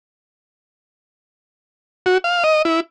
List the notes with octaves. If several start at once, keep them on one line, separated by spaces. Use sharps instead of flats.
F#4
F5
D#5
E4